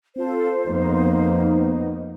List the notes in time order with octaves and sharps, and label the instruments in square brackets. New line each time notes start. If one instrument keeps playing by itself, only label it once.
[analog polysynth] C4 F4 A4 [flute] C5
[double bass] F2 A#3 [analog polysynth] B3 D#4